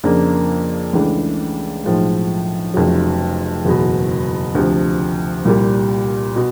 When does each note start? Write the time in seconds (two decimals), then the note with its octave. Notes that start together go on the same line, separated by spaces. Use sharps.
0.03 F2 C#3 F3 A#3 D4
0.93 C#2 C#3 E3 A3 D4
1.83 B1 A2 F3 G#3
2.74 F1 F2 C#3 F#3
3.65 F#1 E2 B2
4.55 D2 C3 F3
5.45 C2 A#2 G3
6.36 B2